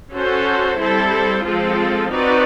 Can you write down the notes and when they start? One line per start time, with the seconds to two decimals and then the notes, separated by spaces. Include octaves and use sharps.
0.13 C#4 F#4 A4 C5
0.79 G3 C4 E4 A4 C5
1.45 F3 G#3 C4 F4 A4
2.10 C4 D#4 F#4 B4 D5